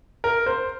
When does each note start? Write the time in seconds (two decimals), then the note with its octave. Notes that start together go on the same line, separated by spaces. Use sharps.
0.24 A#4
0.46 C5